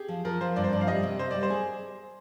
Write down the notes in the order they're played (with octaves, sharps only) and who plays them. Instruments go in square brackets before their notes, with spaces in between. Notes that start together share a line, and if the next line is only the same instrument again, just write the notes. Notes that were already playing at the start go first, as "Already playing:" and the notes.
Already playing: [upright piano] G4 G#4
[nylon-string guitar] F3
[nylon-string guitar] F3 [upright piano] A#4
[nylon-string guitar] F3 [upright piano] C5
[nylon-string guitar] G2 [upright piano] D5
[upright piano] C5
[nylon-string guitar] F3 [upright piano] D5
[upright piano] F5
[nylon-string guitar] G3 [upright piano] D#5
[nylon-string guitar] C3
[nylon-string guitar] C3 [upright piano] C5
[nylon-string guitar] G3 [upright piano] D5
[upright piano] C5
[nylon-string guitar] G#4